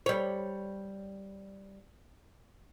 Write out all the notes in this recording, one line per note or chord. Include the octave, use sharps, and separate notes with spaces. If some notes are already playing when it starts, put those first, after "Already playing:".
G3 C#5